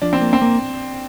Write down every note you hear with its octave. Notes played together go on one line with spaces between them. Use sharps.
F3 D4
C4
A#3
C4
A#3